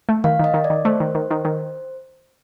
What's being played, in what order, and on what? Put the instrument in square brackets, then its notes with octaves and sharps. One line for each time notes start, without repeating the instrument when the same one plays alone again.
[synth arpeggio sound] A3
[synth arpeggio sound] D#3 [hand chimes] F5
[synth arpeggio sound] D#3 [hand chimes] D#5
[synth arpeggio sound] D#3
[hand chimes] D5
[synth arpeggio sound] D#3
[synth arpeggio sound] A3 [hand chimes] C5
[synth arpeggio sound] D#3
D#3
D#3
D#3